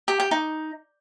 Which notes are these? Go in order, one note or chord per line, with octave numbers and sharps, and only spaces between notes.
G4
G4
D#4